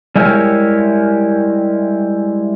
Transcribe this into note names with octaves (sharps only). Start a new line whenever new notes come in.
G3 G#3 E4 G4 A#4 C#5